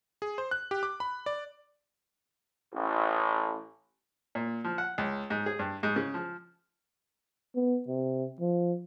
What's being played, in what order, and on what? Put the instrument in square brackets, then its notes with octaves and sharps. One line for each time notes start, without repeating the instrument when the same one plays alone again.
[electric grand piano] G#4
C5
F#6
G4
D6
B5
D5
[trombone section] A1
[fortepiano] A#2
F3
F#5
C#2
G#2
G#4
G2
G#2
C#3
F3
[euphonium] B3
C3
F3